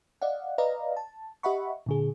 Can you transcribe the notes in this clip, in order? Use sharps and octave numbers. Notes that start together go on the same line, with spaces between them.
D5 D#5 F5 F#5
B4 D5 D#5 F5 A#5
A5
G4 D#5 E5 F#5 B5 C#6
A#2 D3 G#4